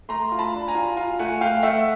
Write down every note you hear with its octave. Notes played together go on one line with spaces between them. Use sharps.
A3 A#5 C6
F4
A5 B5
D4
G#5 A#5
F4
F4
A3 F#5 G#5
A3 F5 G5
A3 E5 F#5